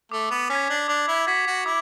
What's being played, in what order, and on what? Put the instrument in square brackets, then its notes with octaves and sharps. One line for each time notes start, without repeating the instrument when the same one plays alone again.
[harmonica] A3 [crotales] D6
[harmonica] B3
[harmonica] C#4 [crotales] B6
[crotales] G#6
[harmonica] D4
[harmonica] D4 [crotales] D6
[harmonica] E4
[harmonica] F#4 [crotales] G#6 B6
[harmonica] F#4
[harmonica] E4 [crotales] D6